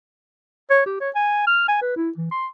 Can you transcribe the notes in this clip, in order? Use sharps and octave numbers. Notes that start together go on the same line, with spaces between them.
C#5
G4
C#5
G#5
F6
G#5
B4
E4
E3
C6